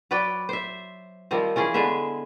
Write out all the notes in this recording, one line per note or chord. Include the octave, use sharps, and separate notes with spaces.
F#3 B4 D5 G5
C5 E5
D#3 F3 G3 C4
E3 C#4 F4 G#4
D3 G#3 B3 E5